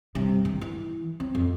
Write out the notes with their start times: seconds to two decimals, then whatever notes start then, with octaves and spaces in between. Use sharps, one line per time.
0.15 G2 C3
0.45 D#3
0.61 E3
1.20 C4
1.35 F2